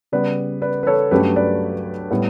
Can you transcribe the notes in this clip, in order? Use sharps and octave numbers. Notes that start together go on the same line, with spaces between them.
C#3 G3 B3 B4 D5
B4 D5
B4
A4 C#5
G2 F#3 A3 C#4 G4 B4
B4 D5
A2 G3 B3